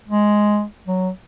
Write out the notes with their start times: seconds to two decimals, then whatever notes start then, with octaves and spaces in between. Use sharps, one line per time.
0.08 G#3
0.88 F#3